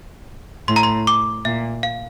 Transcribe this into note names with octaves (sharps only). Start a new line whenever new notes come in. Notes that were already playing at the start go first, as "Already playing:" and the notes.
A2 C6
A#5
C6
D6
A#2 E5
F5